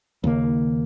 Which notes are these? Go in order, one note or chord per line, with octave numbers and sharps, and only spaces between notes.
D#2 C#3 A#3